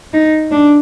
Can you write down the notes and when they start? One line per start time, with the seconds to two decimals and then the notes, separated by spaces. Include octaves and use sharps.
0.13 D#4
0.51 D4